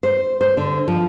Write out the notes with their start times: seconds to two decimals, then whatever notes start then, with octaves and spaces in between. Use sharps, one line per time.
0.03 C5
0.41 C5
0.57 D3
0.88 F3